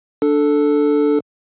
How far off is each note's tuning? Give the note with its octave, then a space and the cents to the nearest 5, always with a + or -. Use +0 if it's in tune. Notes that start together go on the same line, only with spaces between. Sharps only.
D4 +0 A4 +0